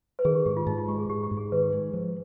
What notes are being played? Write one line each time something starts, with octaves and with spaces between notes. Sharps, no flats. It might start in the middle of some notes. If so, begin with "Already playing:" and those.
B4
D#3 G#4
G4
G#2 G4
F4
G#2 D#4
F4
G#3 G4
G#4
G#2 G4
G4
G#2
G#4
D#3 B4
G#3
F3